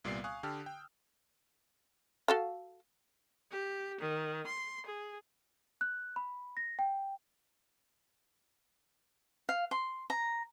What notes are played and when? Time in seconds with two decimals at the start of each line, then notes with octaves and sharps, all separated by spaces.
0.04 C2 A#2 G3 B3 D5 C7
0.24 F5 G#5 C#6 D#6 F#6
0.43 D3 G4 G5 A5 E6 F6
0.66 G5
2.28 F#4 A4 F5
3.51 G4
4.00 D#3
4.47 C6
4.86 G#4
5.81 F#6
6.16 B5
6.57 A#6
6.79 G5
9.49 F5
9.71 C6
10.10 A#5